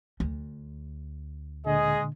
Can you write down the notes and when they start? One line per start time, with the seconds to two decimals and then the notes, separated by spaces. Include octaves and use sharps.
0.20 D2
1.66 A#2 D3 G#3 G#4 D#5